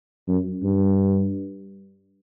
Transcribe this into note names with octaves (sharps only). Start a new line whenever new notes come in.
F#2
G2